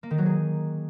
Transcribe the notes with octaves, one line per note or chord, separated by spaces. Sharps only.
A#3
D#3
F#3
G#4